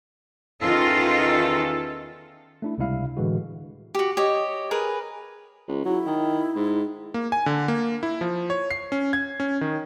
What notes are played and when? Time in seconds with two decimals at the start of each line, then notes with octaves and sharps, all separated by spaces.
0.62 E2 D#3 C#4 D#4 F4 A4
2.62 A3 D4 E4
2.78 C#2 C3 G3 E4 F5
3.17 A2 D3 E3 G#3 F#4
3.95 F#4 G4
4.17 G4 C#5 D#5
4.71 G#4 A#4 B4
5.68 C#2
5.85 F#3 E4
6.06 D#3
6.56 G#2
7.14 A#3
7.32 G#5
7.46 D3
7.68 A#3
8.03 E4
8.21 F3
8.50 C#5
8.71 C7
8.92 C#4
9.13 G#6
9.40 C#4
9.61 D#3